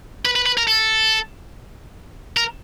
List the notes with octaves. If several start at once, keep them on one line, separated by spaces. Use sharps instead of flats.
B4
B4
B4
A#4
A4
A#4